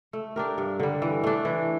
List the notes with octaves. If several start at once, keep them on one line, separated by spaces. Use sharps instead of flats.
A3
D4 G4 A#4
G2
D3 G3
E3
A3 D4
E3